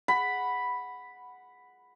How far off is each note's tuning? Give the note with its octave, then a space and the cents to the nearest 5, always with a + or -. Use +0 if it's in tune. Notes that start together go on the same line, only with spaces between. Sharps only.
F#5 +0 B5 +0